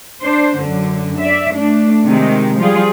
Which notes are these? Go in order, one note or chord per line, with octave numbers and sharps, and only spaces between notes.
D4 C5
F#2 D3
D5 E5
A3 D4
C3 D#3 G#3
F3 G3 F4 G#4